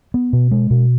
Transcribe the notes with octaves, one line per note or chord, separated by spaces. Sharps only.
B3
B2
G#3
B2